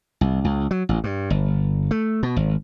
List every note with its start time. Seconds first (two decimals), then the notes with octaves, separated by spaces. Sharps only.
0.21 C2
0.44 C#2
0.71 F#3
0.89 A1
1.04 G2
1.30 G1
1.91 A3
2.23 B2
2.36 G#1